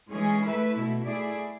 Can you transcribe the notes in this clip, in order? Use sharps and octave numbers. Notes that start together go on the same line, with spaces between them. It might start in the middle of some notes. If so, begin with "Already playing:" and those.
E3 G#3 C#4 G#4
A3 E4 B4 E5
B2 A3 E4
A3 E4 G#4 D5